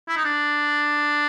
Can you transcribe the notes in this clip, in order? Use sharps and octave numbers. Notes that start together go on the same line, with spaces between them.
E4
D#4
D4